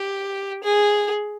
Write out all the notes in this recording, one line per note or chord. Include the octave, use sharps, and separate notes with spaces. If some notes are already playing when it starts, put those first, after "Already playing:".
Already playing: G4
G#4